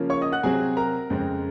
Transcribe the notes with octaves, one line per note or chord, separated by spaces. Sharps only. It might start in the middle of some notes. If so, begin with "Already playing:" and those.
Already playing: C#3 F3 A#3 C#4
C#5 C#6
D#5 D#6
F#5 F#6
C3 F#3 C4 G#4 G#5
A#4 A#5
F2 C#3 G#3 C4